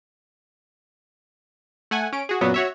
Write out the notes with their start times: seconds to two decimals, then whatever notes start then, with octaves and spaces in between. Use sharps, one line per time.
1.91 A3 F#5 G#5
2.12 C#4 D7
2.29 F#4 G#4
2.41 F#2 A#2 F#3 B3 F#4
2.54 F#4 C#5 E5